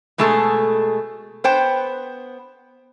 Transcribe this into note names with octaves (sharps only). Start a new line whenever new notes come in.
B2 G#3 A3 G#4 A4
B3 C5 G5